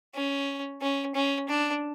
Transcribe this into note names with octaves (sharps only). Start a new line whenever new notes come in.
C#4
C#4
C#4
D4